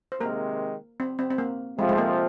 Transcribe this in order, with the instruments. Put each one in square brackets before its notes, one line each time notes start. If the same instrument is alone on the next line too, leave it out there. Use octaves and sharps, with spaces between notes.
[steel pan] C5
[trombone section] C3 D#3 G#3 [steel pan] A#3 A#4
[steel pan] C4
C4
C4
A#3
[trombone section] F2 C3 F3 [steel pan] G#3
[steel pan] G#3
A#3